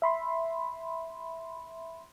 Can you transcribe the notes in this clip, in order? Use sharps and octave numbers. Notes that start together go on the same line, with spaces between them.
E5 B5 C6